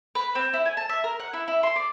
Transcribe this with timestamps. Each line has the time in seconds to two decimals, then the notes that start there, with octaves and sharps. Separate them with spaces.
0.15 B4
0.35 C4
0.53 E4
0.65 G#5
0.77 A5
0.89 E5
1.04 A#4
1.20 F#5
1.33 E4
1.48 E4
1.63 C6
1.76 D5